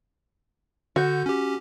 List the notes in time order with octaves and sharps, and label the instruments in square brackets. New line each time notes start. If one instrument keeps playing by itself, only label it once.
[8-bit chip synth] D3 G6 [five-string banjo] F#4
[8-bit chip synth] C#4 G4